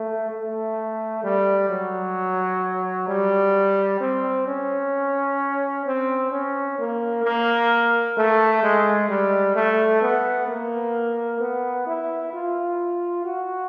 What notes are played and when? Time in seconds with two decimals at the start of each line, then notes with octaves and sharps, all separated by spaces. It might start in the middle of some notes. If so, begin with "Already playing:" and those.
Already playing: A3
0.31 A3
1.23 G3
1.69 F#3
3.08 G3
4.00 C4
4.47 C#4
5.86 C4
6.32 C#4
6.78 A#3
7.24 A#3
8.17 A3
8.63 G#3
9.09 G3
9.55 A3
10.01 B3
10.48 A#3
11.40 B3
11.86 E4
12.33 F4
13.24 F#4